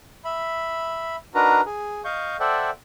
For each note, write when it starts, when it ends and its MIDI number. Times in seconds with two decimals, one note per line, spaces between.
0.25 1.16 76
0.25 1.16 83
1.35 1.61 62
1.35 1.61 63
1.35 1.61 66
1.35 1.61 70
1.35 1.61 71
1.35 1.61 82
1.66 2.02 68
2.05 2.37 75
2.05 2.37 77
2.05 2.37 85
2.05 2.37 91
2.40 2.70 69
2.40 2.70 72
2.40 2.70 74
2.40 2.70 76
2.40 2.70 78
2.40 2.70 79